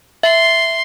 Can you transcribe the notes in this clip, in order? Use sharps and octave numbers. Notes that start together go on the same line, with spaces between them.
E5 C6